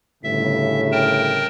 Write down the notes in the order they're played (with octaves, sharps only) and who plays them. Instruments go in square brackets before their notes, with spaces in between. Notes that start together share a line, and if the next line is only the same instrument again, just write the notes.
[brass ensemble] G1 A2 C#3 [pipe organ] E5
[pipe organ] A#4 G5 A5